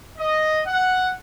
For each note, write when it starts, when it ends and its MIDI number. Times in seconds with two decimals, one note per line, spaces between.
0.18 0.62 75
0.66 1.13 78